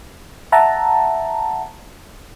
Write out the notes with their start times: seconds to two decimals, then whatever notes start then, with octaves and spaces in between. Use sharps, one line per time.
0.52 E5 F#5 A5 A#5